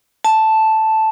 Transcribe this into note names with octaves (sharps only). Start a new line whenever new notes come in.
A5